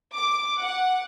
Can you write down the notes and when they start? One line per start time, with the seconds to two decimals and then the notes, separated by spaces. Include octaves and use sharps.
0.16 D6
0.61 F#5